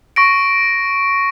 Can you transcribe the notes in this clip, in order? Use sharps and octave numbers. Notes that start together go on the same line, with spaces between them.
C#6 A#6 D7